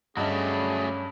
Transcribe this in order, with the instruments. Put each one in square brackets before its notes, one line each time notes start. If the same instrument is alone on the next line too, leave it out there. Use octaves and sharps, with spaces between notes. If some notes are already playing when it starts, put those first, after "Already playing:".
[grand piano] G2 G3 D#5 [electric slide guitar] F#3 A3 [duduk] C#4 [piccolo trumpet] G#4